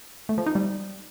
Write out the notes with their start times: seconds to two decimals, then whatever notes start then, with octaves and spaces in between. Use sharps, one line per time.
0.29 A3
0.38 F3
0.47 D#4
0.55 G3